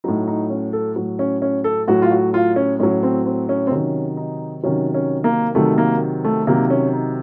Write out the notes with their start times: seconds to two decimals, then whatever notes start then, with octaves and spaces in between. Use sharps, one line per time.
0.04 A2 F#3 D#4
0.28 D#4
0.50 C#4
0.73 A4
0.96 A2 F#3
1.19 C#4
1.42 C#4
1.64 A4
1.88 A2 F#3 F#4
2.02 F4
2.11 F#4
2.34 F4
2.56 C#4
2.79 A2 F#3 C#4
3.03 C4
3.26 C4
3.49 C#4
3.67 C4
3.71 C3 D#3 F#3 C#4
4.17 D#4
4.63 C3 D#3 F#3 C#4
4.94 C#4
5.24 A#3
5.55 C3 D#3 F#3 A3
5.78 A#3
6.24 A3
6.47 C3 D#3 F#3 A#3
6.70 C#4
6.93 D#4